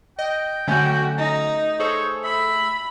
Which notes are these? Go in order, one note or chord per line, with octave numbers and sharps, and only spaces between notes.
D#5 G5
D3 F#3 A3 C#4 F#4 G6
D#4 A#5
G#4 A4 C5 C#5
E5 B5